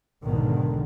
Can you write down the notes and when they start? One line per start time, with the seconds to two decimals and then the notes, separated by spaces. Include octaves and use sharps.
0.24 B1 E2 G#2 B2 D3 D#3